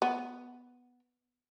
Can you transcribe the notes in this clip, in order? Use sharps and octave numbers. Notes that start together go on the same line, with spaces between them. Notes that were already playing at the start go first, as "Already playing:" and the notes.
B3